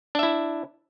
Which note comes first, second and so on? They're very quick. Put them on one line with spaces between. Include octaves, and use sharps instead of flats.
D4 E5 E4